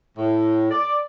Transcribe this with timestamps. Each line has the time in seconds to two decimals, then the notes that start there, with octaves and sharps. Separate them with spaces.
0.17 A2
0.70 D5